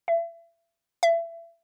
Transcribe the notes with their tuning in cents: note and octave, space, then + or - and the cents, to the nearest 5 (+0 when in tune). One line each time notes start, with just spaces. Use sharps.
E5 +35
E5 +30